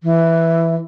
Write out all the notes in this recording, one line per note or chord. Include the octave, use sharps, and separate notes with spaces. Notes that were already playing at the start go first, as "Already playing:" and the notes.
E3